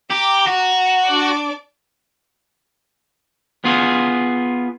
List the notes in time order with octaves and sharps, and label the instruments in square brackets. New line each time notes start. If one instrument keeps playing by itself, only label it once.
[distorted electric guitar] G4 [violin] A#5 D6
[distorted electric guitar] F#4 [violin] A#5
[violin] D4 D5
[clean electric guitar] B3 F4 G#4